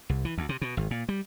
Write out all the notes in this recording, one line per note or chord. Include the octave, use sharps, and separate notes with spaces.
C2
E3
D2
C3
B2
G#1
A#2
G3